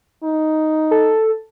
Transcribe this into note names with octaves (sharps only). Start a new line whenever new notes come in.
D#4
A4